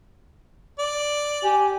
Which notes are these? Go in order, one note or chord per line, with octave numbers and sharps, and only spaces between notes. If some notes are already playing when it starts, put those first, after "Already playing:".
D5
G4 G#5